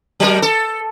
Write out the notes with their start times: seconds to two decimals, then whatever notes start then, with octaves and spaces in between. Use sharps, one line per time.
0.20 F#3 A#4
0.42 A4